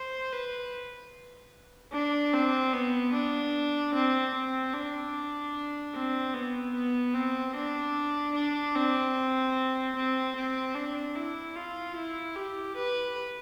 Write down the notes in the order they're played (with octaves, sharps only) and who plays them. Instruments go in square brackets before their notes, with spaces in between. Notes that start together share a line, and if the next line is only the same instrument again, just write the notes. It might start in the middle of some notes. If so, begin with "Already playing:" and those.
Already playing: [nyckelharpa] C5
B4
D4
C4
B3
D4
C4
C4
D4
C4
B3
B3
C4
D4
D4
C4
C4
C4
D4
E4
F4
E4
G4
B4